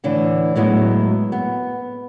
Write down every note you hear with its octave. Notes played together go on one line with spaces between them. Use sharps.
A2 D3 E3
A2 F#3 G#3 B3 E4
B3